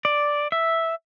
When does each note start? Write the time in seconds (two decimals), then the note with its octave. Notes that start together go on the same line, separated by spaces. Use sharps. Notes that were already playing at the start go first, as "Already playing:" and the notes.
0.05 D5
0.52 E5